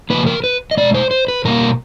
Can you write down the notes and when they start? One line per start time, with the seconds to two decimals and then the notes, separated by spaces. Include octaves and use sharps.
0.10 C#3 F3 A#3 B4
0.26 A#4
0.44 B4
0.71 D#5
0.77 B2 G#3 D5
0.94 C5
1.11 C5
1.28 B4
1.45 B2 G3 A#3 A#4